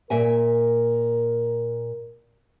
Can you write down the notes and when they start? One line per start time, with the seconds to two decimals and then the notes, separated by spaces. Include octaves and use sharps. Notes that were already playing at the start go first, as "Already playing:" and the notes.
0.10 A#2 A#4 E5 G#5